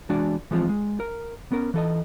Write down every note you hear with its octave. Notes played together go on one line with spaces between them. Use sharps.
E3 G#3 D4 F#4 D5
E3 F3 G#3 C4 F4
G#3
A#4
B3 C#4 A#4
E3 A4 D#5